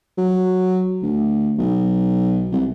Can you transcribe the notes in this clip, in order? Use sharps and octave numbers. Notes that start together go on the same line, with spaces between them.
F#3
D2
B1
C2